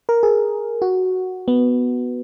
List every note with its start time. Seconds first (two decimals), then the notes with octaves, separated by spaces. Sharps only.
0.09 A#4
0.23 G#4
0.82 F#4
1.48 B3